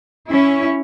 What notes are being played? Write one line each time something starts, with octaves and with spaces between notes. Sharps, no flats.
C#4 E4